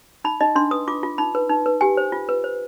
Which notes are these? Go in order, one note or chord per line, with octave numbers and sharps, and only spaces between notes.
D#4 B5
D#4 D#5
D4 C6
B4 D#6
F4 D6
F4
D#4 B5
B4
D#4
B4
G4 G#5
C5
F4
B4
C5